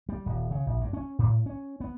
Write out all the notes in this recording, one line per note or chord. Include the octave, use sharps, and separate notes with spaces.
G3
D#1
C#3
A#1
G2
C#4
A2
C#4
B3